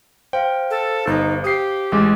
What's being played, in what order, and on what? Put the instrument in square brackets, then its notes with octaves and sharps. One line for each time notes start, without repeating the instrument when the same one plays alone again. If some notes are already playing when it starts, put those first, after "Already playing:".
[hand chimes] C5 F5 [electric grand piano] G5
[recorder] A4
[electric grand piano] G1 [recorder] D#4
[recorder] G4 [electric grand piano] D#6 C7
[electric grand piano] A1 G#3 [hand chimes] D6